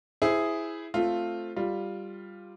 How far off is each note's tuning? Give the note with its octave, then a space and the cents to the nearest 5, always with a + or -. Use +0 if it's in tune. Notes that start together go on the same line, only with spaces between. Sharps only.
E4 +0 G#4 +0 C5 -25
A3 +0 C4 +5 F4 +0
G3 +0 F4 +0